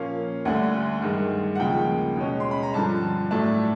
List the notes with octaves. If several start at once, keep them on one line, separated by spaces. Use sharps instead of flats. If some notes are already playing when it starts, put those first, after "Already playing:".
Already playing: A#2 F3 A#3 C#4 F5
D2 D3 G3 F#5
G2 D#3 G#3
F#5
D#2 C#3 F3 G#3 G5
B2 G#3 C#4
C6
B5
A#5
G2 D3 F3 A5
A2 F#3 A3 D4 A5